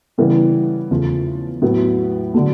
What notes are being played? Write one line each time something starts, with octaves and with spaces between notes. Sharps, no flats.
C#3 E3 G3 B3
E2 C#3 F3 A3
A2 F#3 B3
D3 F#3 A3